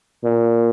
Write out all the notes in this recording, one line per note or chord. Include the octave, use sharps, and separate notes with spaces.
A#2